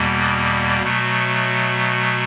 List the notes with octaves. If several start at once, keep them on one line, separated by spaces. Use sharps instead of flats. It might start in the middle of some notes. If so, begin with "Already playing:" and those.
Already playing: E2 B2 G3 A#3
B2 F#3 A3